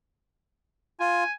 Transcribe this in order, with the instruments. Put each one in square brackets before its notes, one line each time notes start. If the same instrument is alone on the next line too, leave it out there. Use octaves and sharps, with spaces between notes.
[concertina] F4 [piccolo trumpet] G#5